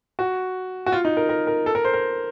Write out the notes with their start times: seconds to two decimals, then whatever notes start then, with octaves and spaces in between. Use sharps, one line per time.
0.19 F#4
0.86 F#4
0.92 F4
1.05 D#4
1.17 A#4
1.29 A#4
1.47 A#4
1.66 A4
1.75 A#4
1.85 C5
1.94 A#4